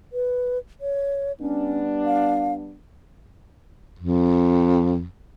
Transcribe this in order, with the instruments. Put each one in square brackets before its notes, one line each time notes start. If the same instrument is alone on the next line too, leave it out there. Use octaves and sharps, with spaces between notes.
[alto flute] B4
C#5
[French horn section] G3 B3 D4 [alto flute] C#4
[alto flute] F5
[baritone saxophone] F2